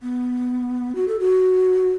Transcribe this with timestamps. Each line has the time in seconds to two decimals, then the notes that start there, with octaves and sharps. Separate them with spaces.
0.03 B3
0.95 F#4
1.08 A4
1.20 F#4